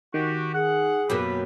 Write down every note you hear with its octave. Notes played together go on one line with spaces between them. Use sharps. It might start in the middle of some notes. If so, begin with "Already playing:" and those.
D#3 F#4 G4
G#4 F#5
F#2 B2 A#3 G4 B4